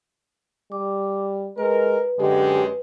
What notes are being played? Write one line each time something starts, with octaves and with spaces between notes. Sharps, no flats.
G3 D6
G#3 A#4 B4
F#2 D3 G#3 G4